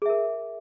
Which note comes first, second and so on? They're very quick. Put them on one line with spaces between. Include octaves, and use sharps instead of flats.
G#4 E5 A#4